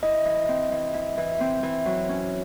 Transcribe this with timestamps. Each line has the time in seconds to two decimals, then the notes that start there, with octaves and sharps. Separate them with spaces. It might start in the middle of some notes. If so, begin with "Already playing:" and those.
0.03 E4 D#5
0.25 E3
0.48 C4
0.72 E3
0.94 E4
1.17 E3
1.40 C4
1.63 E3
1.86 F#3
2.09 C#4